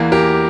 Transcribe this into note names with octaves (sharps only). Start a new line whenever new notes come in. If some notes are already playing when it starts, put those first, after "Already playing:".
Already playing: E2 E3 A#3
G4 A#4